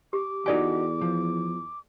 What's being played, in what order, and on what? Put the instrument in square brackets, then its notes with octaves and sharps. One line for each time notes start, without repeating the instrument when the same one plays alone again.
[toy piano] G4 [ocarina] D6
[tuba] E2 [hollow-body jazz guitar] D#4 F#4 G4 [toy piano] A4 D5 G#5
[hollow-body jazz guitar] F3